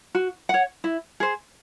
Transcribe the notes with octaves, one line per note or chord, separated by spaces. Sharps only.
F#4
C#5 F#5
E4
G#4 C5